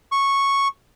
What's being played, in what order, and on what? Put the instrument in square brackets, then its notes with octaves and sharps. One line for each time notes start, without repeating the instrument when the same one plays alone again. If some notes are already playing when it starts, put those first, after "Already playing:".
[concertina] C#6